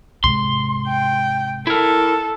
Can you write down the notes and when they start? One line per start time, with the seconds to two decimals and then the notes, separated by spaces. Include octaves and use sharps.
0.24 G#2 C3 C6
0.88 G5
1.67 E4 A4 A#4